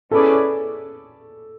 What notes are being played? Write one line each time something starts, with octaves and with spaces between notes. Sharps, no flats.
C#4 E4 G#4 A4 B4 D5